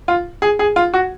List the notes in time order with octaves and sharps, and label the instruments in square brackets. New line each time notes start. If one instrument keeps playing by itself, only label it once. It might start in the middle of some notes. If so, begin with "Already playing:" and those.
[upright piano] F4
G#4
G#4
F4
F#4